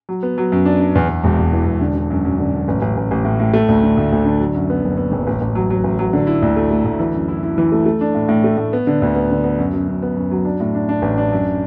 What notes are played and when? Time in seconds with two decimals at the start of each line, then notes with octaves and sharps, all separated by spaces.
0.09 F#3
0.23 B3
0.38 F#3
0.52 F#2
0.65 D4
0.80 D4
0.95 E2
1.09 E2
1.24 E1
1.39 E1
1.53 E3
1.66 E1
1.81 D3
1.95 D3
2.10 F#2
2.25 F#2
2.38 D3
2.53 F#2
2.68 A1
2.82 A1
2.97 A1
3.11 A1
3.25 A2
3.40 A2
3.53 A3
3.69 D2
3.82 D3
3.97 D2
4.12 D2
4.25 D3
4.40 F#3
4.54 F#2
4.70 B3
4.84 F#1
4.97 B3
5.12 F#1
5.27 A1
5.41 A1
5.55 F#3
5.70 F#3
5.84 A1
5.99 F#3
6.13 D3
6.27 E4
6.42 D2
6.57 A3
6.71 A3
6.85 D2
7.00 E3
7.14 F#2
7.28 E4
7.43 E4
7.58 E3
7.72 A3
7.86 A3
8.01 D4
8.15 A2
8.29 A2
8.44 A3
8.57 A2
8.73 B3
8.87 D3
9.02 D2
9.15 B3
9.30 D3
9.44 B3
9.58 F#2
9.73 F#2
9.88 F#2
10.02 B3
10.16 F#2
10.31 F#3
10.45 D4
10.60 A2
10.75 D4
10.89 D4
11.02 A1
11.18 D4
11.32 F#2